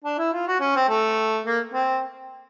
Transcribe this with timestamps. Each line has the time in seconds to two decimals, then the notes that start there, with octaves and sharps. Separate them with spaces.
0.05 D4
0.18 E4
0.33 F4
0.47 F#4
0.60 C#4
0.76 C4
0.89 A3
1.46 A#3
1.74 C4